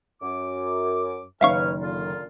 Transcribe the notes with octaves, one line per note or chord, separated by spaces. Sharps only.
F#2 D6
F#1 D#3 B4 C#5 E5 F5 C#6 F6
A#2 D3 F4